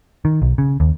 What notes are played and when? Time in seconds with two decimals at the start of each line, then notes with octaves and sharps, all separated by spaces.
0.25 D#3
0.42 B1
0.58 C#3
0.80 D#2